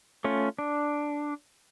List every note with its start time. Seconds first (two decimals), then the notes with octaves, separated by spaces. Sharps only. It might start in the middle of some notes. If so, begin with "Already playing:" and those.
0.24 A3 C#4 F4
0.59 D4